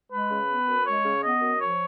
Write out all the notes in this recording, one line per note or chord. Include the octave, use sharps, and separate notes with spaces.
G#3 B4
C#3
B3
F#2
G#3 C#5
C#3
B3 D#5
F#2
F3 C#5